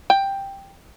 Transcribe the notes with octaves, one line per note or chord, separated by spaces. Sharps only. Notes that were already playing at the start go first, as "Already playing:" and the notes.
G5